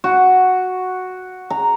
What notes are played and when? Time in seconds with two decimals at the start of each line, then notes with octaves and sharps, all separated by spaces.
0.04 F#4
1.50 A#5